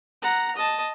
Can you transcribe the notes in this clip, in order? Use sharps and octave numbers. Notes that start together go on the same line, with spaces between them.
F#5 A#5
D#5 A5